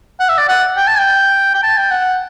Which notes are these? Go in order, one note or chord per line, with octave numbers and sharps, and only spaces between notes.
F#5
E5
D5
F#5
G5
A5
G5
G5
A5
G5
F#5